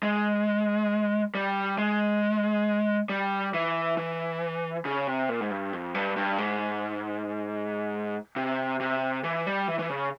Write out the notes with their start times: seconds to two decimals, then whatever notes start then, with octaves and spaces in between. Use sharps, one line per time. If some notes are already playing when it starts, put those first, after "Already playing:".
0.03 G#3
1.35 G3
1.78 G#3
3.09 G3
3.54 E3
3.97 E3
4.85 C#3
5.07 C3
5.29 A#2
5.41 G#2
5.51 G2
5.73 F2
5.95 G2
6.17 G2
6.38 G#2
8.36 C3
8.80 C3
9.24 E3
9.46 G3
9.68 E3
9.79 E3
9.90 C#3